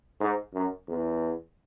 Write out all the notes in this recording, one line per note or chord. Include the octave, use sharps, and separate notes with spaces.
G#2
F#2
E2